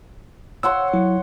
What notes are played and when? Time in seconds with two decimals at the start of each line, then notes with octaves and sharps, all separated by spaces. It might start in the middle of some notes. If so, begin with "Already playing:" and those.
0.63 C#5 F#5 C6 E6
0.93 F#3 E4